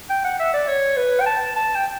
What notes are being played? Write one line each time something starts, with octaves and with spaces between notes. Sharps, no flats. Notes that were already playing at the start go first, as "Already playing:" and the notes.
G5
F#5
E5
D5
C#5
B4
G5
A5
A5
G5